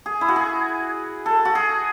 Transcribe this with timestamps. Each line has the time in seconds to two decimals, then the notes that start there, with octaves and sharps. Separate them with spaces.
0.06 G#4
0.21 E4
0.28 F#4
0.36 G#4
1.26 A4
1.45 F#4
1.55 G#4